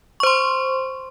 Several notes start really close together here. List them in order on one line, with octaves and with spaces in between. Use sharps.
C#6 C5 C6